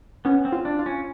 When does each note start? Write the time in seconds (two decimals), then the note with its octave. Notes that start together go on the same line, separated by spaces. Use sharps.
0.25 B3 C#4
0.45 C4
0.52 F4
0.65 D4
0.79 F4
0.86 C#4